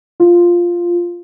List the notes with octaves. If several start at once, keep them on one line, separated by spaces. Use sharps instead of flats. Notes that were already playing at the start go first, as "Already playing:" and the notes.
F4